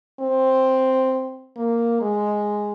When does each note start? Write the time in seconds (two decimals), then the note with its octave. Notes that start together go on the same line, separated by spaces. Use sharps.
0.20 C4
1.57 A#3
2.01 G#3